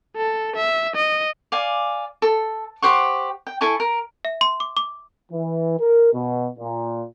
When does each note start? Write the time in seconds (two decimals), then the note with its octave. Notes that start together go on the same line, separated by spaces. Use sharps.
0.17 A4
0.56 E5
0.96 D#5
1.52 D5 F5 G#5
2.22 A4
2.82 G4 C5 F#5 C#6
3.47 G5
3.61 E4 A4 G#5 C#6
3.80 A#4
4.25 E5
4.41 C6
4.60 D6
4.77 D6
5.32 E3
5.80 A#4
6.13 B2
6.59 A#2